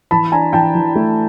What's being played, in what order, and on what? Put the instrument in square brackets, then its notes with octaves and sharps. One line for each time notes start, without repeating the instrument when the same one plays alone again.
[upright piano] E3 A5 B5
D4 G#5 A#5
E3 G5 A5
E3
A3